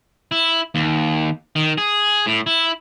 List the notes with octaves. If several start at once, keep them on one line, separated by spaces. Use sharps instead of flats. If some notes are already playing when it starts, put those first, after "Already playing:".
E4
D#2
D#3
G#4
A2
E4